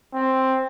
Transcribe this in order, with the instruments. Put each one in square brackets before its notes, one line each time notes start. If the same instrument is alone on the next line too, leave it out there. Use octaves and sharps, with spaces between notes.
[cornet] C4